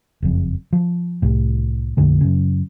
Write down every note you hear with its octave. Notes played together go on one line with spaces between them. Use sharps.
F#1 F2
F3
C2 A2
A#1 F2 D3 A3
F#2 C#3